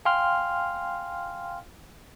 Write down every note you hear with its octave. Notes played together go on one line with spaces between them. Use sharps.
F5 G5 G#5 C6 F6